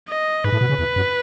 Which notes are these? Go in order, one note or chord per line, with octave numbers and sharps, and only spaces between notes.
D#5
G#2 B4
A2
B2
C#3
E2
F#2